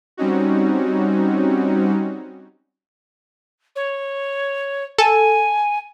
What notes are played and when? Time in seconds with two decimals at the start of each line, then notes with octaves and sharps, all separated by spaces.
0.17 G3 C4 C#4 D#4 F#4
3.76 C#5
4.98 A4 G#5